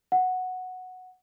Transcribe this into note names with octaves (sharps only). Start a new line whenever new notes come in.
F#5